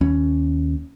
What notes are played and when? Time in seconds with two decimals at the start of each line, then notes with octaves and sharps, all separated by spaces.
0.01 D#2 C#4